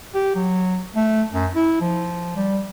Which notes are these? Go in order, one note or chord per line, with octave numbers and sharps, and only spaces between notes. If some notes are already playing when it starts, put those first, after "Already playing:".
G4
F#3
A3
F#2
E4
F3
G3